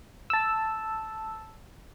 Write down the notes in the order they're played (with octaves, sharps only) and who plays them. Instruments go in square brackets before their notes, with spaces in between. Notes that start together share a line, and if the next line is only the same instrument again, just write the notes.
[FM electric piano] A5 E6